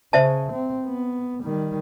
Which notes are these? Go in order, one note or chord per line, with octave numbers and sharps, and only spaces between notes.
C#3 C5 E5 A5
C4
B3
D#3 G3